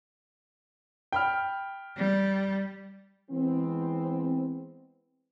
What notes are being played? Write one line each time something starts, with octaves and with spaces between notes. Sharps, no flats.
G5 B5 F6
G3
E3 G#3 B3 C4